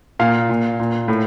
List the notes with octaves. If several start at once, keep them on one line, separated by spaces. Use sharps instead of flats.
A#2 F5
A#2
A#2
A2